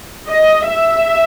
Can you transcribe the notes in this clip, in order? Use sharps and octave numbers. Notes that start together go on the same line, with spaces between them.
D#5
E5